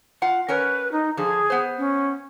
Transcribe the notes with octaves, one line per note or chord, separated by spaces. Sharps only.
F4 F#5
C#4 A#4 B4 C#5
D#4
D3 F3 G#4
B3 C5
C#4